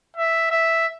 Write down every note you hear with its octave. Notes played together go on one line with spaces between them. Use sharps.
E5
E5